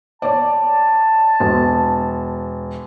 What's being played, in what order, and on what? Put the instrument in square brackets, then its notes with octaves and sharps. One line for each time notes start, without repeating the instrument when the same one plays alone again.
[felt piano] C#5 D5 [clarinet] A5
[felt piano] E1